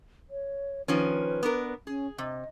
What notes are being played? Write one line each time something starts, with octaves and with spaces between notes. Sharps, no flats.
C#5
D#3 F3 C#4 B4
B3 D4 A#4
C#4 G#4
C3 D#5